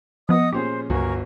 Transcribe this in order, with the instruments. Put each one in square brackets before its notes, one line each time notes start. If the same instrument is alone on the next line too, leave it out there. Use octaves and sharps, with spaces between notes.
[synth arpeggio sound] F3 B3 [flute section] D#5 F#5 D#6
[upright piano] A#2 C#4 G#4 [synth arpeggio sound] G4 [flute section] C5
[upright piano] G1 F#4 [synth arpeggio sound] C#2 [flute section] A#4 G#5 C#6